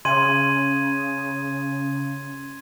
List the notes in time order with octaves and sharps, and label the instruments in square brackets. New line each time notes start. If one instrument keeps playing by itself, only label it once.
[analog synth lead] C#3 [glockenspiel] C6 G#6 D#7